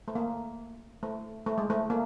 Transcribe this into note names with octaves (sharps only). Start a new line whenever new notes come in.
A3
A#3
A3
A3
G#3
A3
A#3